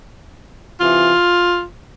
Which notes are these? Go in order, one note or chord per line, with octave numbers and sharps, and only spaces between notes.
C3 E3 F4